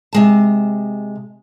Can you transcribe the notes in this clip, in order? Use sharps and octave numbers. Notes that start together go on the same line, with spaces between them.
C3 G#3 A5